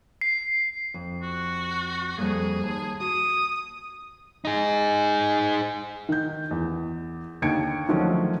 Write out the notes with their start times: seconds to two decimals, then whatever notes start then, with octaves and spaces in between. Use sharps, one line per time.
0.21 C7
0.94 F2
1.22 F#4
2.18 F2 G3 A#3 G#4
2.63 D#2 A5
3.00 F#4 D#6
4.45 D#4 G#4
6.09 D#3 G6
6.51 E2
7.42 D#2 D3 G5 G#6 C#7 D7
7.88 D3 D#3 F3 F#3 A3 C#4